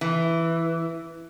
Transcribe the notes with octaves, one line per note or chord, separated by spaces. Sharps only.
E3